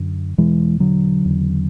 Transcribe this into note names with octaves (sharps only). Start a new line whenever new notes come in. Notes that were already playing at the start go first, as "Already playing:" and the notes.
Already playing: F#2 D3
E2 B2 E3 G#3
D3 F#3
E2 C#3